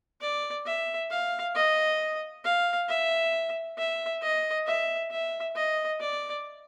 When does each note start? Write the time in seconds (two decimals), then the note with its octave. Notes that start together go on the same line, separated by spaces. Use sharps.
0.21 D5
0.66 E5
1.10 F5
1.55 D#5
2.44 F5
2.89 E5
3.78 E5
4.22 D#5
4.67 E5
5.11 E5
5.56 D#5
6.00 D5